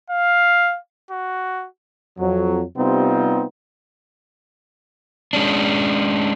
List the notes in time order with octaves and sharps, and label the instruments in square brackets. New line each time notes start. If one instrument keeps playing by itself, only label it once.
[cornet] F5
F#4
[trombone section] F2 F#3
C3 G3 B3 C4 D#4 F4
[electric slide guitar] G#3 C#4 D4